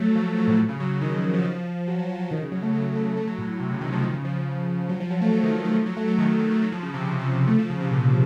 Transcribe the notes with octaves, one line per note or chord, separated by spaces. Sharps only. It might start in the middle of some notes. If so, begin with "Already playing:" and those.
Already playing: F#3 A3
F3
F3
F#3
A2
C#3
F#3
D#3
F3
F3
F#3
F#3
F3
F#3
D#3
C#3
F#3
A3
F#3
A3
A3
F#3
A2
A2
C3
C#3
D#3
F3
D#3
C#3
F3
F#3
F3
F#3
A3
F#3
D#3
D#3
F3
F3
F#3
A3
F#3
D#3
D#3
F#3
A3
F#3
F3
C#3
C3
C#3
F3
F3
A3
F3
C#3
C3
A#2